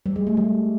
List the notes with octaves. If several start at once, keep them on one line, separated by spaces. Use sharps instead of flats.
G3
G#3
A3
G3